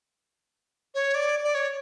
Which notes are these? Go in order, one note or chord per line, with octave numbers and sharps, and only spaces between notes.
C#5
D5
D5
C#5